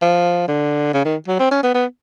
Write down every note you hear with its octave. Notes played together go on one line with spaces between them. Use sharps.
F3
D3
C#3
D#3
F#3
C4
C#4
B3
B3